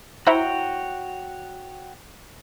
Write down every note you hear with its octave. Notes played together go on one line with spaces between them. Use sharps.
E4 F#4 C5 C#5 G5 A#5